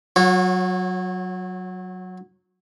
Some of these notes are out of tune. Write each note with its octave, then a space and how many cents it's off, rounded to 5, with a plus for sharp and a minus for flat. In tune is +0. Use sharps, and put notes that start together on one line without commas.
F#3 +0 F#4 -40 C#5 -25